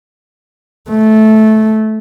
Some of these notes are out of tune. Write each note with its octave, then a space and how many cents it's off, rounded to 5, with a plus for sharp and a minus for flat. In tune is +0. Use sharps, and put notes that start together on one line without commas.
A3 -15